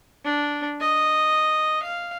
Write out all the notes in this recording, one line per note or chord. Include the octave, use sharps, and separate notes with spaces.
D4
D#5
F5